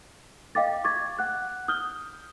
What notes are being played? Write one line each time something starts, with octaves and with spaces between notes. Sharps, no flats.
D#5 F5 G5 D6 A6
C#6 D6 G#6 A6
F#5 F#6
D#6 F6 G6 G7